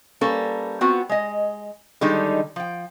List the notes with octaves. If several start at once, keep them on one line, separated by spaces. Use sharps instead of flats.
G3 A#3 C#4 A4 B4
B3 C4 F4 F#4
G#3 D#5
D3 D#3 G3 G#3 D4 D#4
F3 G5